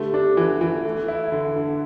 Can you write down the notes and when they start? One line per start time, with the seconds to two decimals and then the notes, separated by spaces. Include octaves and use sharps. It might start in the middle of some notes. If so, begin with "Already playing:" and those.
Already playing: D3 A3 G4
0.14 D4
0.37 E3
0.61 E3
0.85 A3
1.08 E4
1.32 D3
1.56 D3